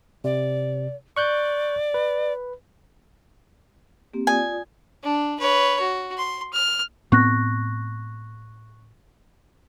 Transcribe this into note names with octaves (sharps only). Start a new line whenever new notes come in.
C3 D5
D5 C#6 F#6 G6
B4
A#3 C4 G4
F4 D5 G#5 D#6
D4
B4 C#5
F#4
C6
F6
A2 B3 C4 C#6 F#6 A#6